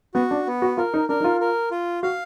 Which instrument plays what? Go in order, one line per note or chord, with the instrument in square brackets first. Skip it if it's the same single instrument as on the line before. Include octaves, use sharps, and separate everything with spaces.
[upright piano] B3 [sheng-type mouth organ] F#4
[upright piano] D4
[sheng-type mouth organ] B3
[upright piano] F#4
[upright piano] F4 [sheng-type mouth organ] A#4
[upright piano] D#4
[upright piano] D4 [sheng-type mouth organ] A#4
[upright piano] D#4
F4
[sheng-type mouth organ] A#4
F4
[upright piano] F#4 [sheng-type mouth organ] F5